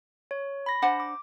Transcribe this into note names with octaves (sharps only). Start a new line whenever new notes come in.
C#5
B5 A#6
D4 C5 F#5
D6